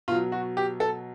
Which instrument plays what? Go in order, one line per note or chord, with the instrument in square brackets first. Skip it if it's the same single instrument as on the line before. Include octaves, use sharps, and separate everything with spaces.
[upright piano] B2 F4
F#3
F#4
G4
A4